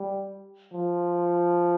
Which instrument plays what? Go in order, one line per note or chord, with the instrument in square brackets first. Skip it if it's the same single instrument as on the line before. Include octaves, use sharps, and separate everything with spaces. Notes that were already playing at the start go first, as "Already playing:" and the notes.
Already playing: [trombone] G3
F3